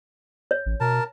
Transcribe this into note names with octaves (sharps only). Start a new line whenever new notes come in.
C#5
A1
B2 A#4 A5